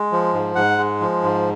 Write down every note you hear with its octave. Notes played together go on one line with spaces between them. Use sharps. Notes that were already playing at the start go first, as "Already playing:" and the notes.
Already playing: G#3
F3
G#2
G#2 F#5
G#3
F3
G#2